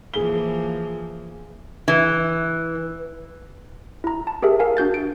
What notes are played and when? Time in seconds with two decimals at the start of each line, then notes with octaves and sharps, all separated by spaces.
0.14 E3 F3 A#3 G#4 G7
1.88 E3
4.04 E4 A#5
4.27 A5
4.42 G4 G#4 A#4 E5
4.59 A#4 F5 G#5
4.77 D4 F#4 G6 A6
4.94 D7